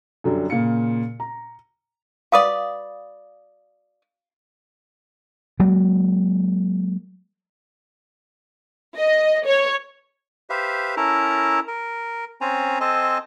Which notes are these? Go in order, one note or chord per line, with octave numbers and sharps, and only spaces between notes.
F#2 D3 F#3 G3
A#2 C#3 F5 C#7
A#5
F#4 B4 D5 F5 D#6
F#3 G#3 A#3
D#5
C#5
G4 B4 C5 E5 F5
C#4 E4 A4 A#4 A5 A#5
A#4
C4 C#4 C5 G#5 A#5
C4 A4 C5 D#5 G#5 A5